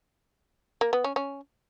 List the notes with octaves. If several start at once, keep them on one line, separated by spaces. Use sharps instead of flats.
A#3
B3
C#4
C#4